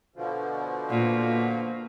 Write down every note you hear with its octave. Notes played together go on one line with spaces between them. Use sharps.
B2 D3 F3
A#2